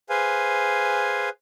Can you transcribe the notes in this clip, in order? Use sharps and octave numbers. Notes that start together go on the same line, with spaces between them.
G#4 B4 C5 F5 G#5